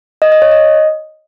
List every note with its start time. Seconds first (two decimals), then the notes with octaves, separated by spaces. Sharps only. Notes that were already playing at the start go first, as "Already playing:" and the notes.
0.22 D#5
0.32 D#5
0.42 C#5
0.52 D#5